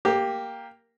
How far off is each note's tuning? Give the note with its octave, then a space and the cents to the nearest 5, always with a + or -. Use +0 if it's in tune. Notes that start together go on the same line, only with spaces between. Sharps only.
A#3 +0 G4 +5